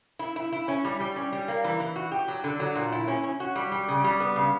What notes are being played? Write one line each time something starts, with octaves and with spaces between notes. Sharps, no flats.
E4
E4
E4
C#4
G3
G3
C#4
G3
A#3
E3
E3
F#4
G4
F#3
D3
F#3
A#2
E4
C#4
C#4
F#4
G3
G3
C#3
G3
B3
C#3